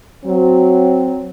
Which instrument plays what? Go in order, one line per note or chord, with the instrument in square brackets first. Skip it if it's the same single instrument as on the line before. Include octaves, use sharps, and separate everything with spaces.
[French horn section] F#3 C4